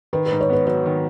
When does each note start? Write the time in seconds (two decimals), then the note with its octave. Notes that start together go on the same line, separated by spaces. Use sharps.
0.13 D#3 B4
0.26 B4
0.32 G#2
0.41 C#5
0.49 B3 B4
0.67 F#3 C#5
0.85 D#3